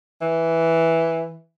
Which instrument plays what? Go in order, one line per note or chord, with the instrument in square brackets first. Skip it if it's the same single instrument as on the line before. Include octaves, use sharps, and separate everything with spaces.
[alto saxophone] E3